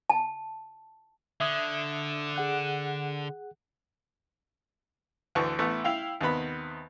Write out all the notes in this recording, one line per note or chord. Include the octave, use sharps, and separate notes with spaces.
A5
D3 E5 D#6 G#6
G#4 F#5 F#6
D2 D3 E3 A5 C#6
A1 A3 B3 E4
E4 F5 G5
D#2 C3 B3 B5